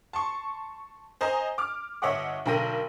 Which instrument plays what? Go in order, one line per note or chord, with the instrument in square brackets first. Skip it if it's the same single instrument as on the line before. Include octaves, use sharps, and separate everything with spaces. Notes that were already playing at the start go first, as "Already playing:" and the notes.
[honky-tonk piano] A5 C6 C#6
C5 D#5 G#5 A#5
D6 F6
G1 C#5 D#5 E5 F#5 D6
B1 D3 A#4 G5 A#6 D#7